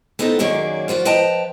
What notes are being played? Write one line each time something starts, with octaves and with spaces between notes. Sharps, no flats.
B3 C4 D#4 F4 A4
F#2 D#3 F#3 A#3 G#4 D5
F3 F4 F#4 D5
F3 B4 D#5 G5 A5 A#5